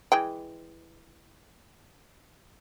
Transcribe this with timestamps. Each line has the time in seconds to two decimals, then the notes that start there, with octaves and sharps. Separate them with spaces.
0.12 E3 G#3 G5